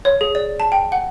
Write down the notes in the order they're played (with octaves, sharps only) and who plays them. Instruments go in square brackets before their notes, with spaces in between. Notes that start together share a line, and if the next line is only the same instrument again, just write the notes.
[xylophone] C#5
G#4
D5
A5
G5
F#5